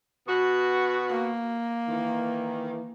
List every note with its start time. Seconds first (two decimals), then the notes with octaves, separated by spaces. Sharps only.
0.27 B2 B3 F#4
1.10 A#3
1.88 D#3 E3